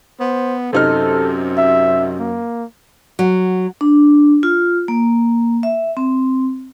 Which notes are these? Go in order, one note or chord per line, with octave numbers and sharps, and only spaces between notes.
B3 C5
F#2 C3 D#4 A4 F6
E5
A#3
F#3
D4
F4
A#3
E5
C4